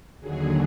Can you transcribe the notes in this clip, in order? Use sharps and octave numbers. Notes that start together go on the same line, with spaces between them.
D#2 D3 F#3 G#4